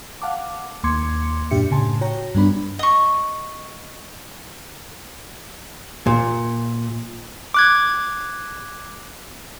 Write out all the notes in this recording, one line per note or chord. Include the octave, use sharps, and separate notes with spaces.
F5 F#5 A5 D6
D#2 A#3 C6 D6 G#6 C#7
F#2 A#2 D4 G4 E5 C#7
A2 C#3 G#5 A5 C6
F#4 C#5 G5 A#5
G2 G3 B3 D4 B5
D#5 C#6
A#2
D6 F#6 G#6